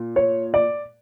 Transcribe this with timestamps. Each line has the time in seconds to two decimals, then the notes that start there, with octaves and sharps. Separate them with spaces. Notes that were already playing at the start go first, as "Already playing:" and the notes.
Already playing: A#2
0.16 C#5
0.54 D5